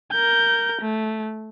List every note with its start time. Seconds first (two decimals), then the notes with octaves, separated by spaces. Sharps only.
0.12 A#4 G6
0.81 A3